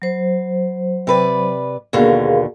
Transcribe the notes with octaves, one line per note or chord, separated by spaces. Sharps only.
F#3 C5
C3 B4 D5
D#2 B2 D3 G#4 A#4 F5